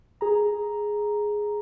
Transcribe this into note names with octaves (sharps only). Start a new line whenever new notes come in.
G#4 A#5